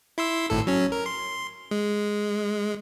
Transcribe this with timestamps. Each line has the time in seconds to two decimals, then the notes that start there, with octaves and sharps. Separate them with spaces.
0.18 E4 C6 E6
0.50 G#1 A2 A4
0.67 F#3 C#4
0.92 A#4
1.06 C6
1.71 G#3